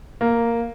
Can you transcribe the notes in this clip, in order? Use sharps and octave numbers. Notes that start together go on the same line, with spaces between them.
A#3